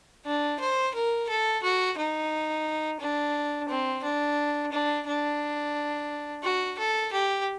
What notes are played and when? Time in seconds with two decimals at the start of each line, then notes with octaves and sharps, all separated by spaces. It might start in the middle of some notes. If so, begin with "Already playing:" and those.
0.25 D4
0.60 C5
0.94 A#4
1.29 A4
1.62 F#4
1.97 D#4
3.00 D4
3.69 C4
4.03 D4
4.72 D4
5.07 D4
6.43 F#4
6.78 A4
7.12 G4